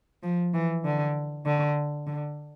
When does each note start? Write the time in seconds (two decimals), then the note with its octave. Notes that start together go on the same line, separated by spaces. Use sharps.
0.23 F3
0.54 E3
0.85 D3
1.46 D3
2.07 D3